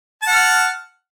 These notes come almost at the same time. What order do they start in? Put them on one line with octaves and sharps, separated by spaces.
A5 F#5 F6